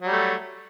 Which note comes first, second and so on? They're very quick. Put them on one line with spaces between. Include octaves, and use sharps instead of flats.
F#3 G3 A3